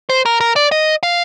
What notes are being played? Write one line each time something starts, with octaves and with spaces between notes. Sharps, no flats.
C5
A#4
A#4
D5
D#5
F5